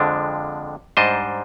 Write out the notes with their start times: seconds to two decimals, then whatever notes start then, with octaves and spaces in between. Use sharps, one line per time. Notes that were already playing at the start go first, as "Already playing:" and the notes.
Already playing: F2 D3 F3 G#3 D4
0.97 G#2 G3 D4 C5 D#5